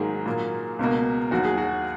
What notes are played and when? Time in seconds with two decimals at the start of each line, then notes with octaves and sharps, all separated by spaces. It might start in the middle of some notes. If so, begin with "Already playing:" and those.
Already playing: G#2 D#3 F#3 A#3 G#4
0.26 A#2 F#3 A#3
0.79 C#2 B2 A#3
1.31 D#2 D#3 F#3 F#4
1.45 G#4
1.58 F#4